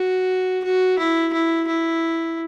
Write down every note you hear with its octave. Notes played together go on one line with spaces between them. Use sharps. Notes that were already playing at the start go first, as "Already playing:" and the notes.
Already playing: F#4
F#4
E4
E4
E4